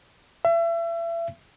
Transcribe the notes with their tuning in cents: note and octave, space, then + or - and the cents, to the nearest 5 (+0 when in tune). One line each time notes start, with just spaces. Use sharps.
E5 +35